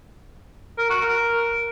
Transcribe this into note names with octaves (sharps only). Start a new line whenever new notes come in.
A#4
F#4
A#4